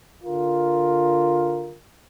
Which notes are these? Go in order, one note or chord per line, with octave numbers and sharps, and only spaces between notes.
D3 F4 A#4